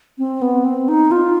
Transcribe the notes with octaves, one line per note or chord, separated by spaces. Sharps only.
C4
B3
C4
D#4
F4